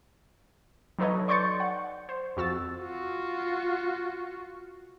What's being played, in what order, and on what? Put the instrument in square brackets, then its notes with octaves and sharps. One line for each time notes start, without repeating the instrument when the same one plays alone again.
[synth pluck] F#3 D#4 A4 B4 C#5 D#5
D5 C6 C#6 G6 A6 C#7
F#5
C5
F2 F#4 E6 A6
[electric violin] F4 F#4